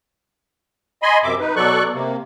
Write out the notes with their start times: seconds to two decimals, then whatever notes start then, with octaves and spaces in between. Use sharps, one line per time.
1.02 D#5 G#5 B5 C6
1.23 F#2 C3 E5 D6
1.40 D#4 B4
1.56 B2 F#3 A4 D5 C#6 F#6
1.94 C3 A#3